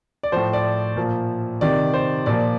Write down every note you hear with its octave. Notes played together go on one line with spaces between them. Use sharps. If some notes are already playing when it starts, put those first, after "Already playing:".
D5
A2 F3 C5
D5
A#2 F3
C3 D#3 D5
C5
A#2 F3 D5